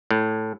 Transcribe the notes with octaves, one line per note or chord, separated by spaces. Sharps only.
A2